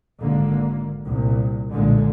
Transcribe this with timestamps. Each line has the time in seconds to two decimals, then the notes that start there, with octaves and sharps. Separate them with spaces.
0.18 G#1 D3 A#3
1.06 C2 A#2
1.72 B1 A#2 D3 G#3